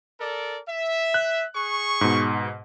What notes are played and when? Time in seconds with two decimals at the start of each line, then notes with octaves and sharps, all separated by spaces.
0.20 A4 A#4 D5
0.67 E5
1.14 F#6
1.55 G#4 C#6
2.01 G#2 B2